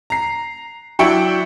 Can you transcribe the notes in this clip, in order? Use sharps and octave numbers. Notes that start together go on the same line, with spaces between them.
A#5 C7
F#3 D4 E4 G5 C#6 C#7